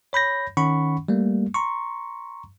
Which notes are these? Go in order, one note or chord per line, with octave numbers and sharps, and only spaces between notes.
C#5 B5 G6 A#6
D#3 C#4 F#5 B5 C#6
G3 A3 A#3
A#5 C6 C#6